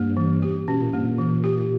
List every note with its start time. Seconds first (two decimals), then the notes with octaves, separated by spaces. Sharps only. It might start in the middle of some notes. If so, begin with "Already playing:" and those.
Already playing: G2 A#3
0.17 E3
0.42 G4
0.68 B2 C#4
0.80 A#2
0.93 G2 A#3
1.05 A#2
1.18 E3
1.44 G4